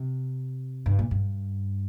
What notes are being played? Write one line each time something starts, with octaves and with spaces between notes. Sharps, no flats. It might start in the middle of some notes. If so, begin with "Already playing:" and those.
Already playing: C3
G2
A#2
G2